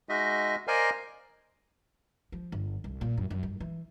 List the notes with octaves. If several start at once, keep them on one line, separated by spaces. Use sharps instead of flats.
G#3 D#4 F#4 D#5 E5
A#4 C5 D5 D#5 F5 G#5
F3
G1
C2
A#2
F#2
F#2
G2
E3